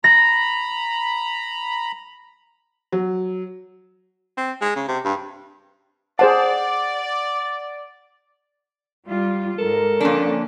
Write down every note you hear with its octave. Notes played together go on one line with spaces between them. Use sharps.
A#5 B5 A#6
F#3
C4
G#3
C#3
C3
G2
G#4 C5 D5 F#5 A5
G3 F4
G#2 A4 A#4
F2 D3 A#3 C#4 D4